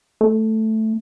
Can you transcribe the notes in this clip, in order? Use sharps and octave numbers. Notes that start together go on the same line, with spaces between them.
A3